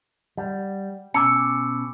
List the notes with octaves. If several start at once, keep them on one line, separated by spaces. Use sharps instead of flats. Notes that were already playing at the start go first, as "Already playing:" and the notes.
G3 F#5
B2 C#4 G#5 D6 E6 C#7